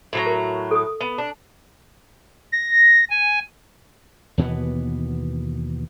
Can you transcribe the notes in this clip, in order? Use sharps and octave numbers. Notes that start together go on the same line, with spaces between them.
A2 F#3 A#5
A#4
A4 D#6
B3
D4
A#6
G#5
D#2 B2 E3 B3